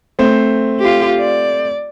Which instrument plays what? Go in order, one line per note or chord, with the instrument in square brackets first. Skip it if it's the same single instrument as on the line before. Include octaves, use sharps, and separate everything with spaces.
[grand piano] A3 C4 C5
[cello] F4 G4
D5